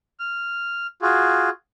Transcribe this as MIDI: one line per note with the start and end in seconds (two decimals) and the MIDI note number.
0.20 0.87 89
1.02 1.50 65
1.02 1.50 66
1.02 1.50 68